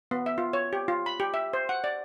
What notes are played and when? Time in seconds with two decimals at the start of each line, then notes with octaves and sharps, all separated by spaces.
0.11 B3
0.26 E5
0.38 F4
0.53 C#5
0.73 G4
0.88 F4
1.06 B5
1.20 G4
1.34 E5
1.53 C5
1.69 F#5
1.84 D5